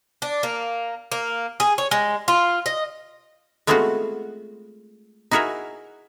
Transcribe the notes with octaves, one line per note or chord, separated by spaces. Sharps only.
D4
A#3
A#3
G#4
C#5
G#3
F4
D#5
G#3 A3 B3 C4 F4 F#4
D#4 E4 F#4 G#4 A#4 E5